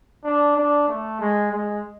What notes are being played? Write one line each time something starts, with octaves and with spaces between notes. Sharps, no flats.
D4
D4
A3
G#3
G#3